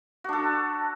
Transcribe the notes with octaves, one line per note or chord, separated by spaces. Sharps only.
D4 F#4 A4